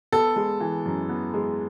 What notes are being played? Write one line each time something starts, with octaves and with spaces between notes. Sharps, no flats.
B3 A4
G#3
E3
F#2
B3
G#3